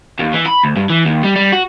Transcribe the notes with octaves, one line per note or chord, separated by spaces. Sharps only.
D#2
E3
B5
D2
G2
E3
D#2
G3
G3
F#4